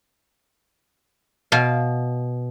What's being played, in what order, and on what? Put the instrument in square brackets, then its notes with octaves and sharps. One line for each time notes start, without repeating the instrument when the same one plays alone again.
[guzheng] B2 F5